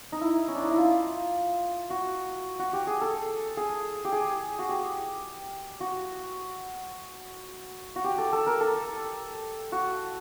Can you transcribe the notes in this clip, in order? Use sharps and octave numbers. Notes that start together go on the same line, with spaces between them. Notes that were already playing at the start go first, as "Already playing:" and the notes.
D#4
E4
C#4
D4
D#4
E4
F4
F#4
F#4
G4
G#4
A4
G#4
G4
G#4
F#4
G4
F#4
F#4
G4
A4
A4
A#4
A4
F#4